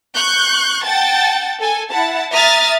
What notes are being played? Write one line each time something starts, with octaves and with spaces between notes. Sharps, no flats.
C#6 F#6 G6
F#5 G5 A5 A6
A4 G#5
E4 F#5 A5
E5 A#5 D#6 F6 A6